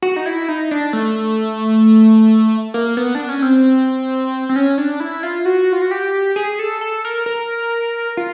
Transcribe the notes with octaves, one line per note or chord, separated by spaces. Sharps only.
F#4
D#4
E4
D#4
D4
A3
A#3
B3
D4
C#4
C4
C4
C#4
D4
E4
F4
F#4
F4
F#4
G4
G#4
A4
A4
A#4
A#4
F4